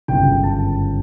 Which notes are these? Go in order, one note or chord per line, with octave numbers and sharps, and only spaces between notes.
G1 F#2 C#3 G5
A5